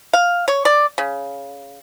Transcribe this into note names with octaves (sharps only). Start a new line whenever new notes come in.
F5
C#5
D5
C#3